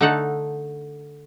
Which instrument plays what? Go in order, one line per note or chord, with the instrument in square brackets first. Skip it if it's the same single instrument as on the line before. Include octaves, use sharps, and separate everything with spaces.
[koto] D3 A3 D#4 A4 F#5